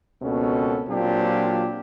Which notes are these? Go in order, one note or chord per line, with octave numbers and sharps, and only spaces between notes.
C#2 B2 A#3 C4 C#4 A4
A#2 F#3 C4 D4 F4 G4